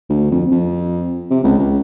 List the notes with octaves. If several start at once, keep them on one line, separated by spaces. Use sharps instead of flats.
D2
F2
F2
C3
C#2
C#2